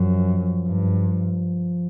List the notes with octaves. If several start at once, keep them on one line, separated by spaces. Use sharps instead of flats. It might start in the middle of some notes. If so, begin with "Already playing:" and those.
Already playing: F#2 F3
G2